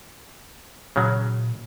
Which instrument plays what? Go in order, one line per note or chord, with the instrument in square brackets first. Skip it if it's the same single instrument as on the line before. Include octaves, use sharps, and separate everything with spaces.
[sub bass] A#2 [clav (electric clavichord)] C#3 F#3